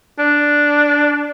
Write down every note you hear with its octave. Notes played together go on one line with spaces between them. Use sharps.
D4